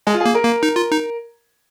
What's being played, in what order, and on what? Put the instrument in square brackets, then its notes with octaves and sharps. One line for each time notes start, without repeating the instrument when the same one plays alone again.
[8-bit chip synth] G#3 [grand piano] G#4
[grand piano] F4
G#4
[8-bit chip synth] A#3
[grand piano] A#4
[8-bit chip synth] A#3
D#4
F4
D#4